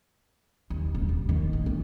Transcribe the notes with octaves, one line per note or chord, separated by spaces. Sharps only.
D#2
D#1
D#1
D#3
A#1
E3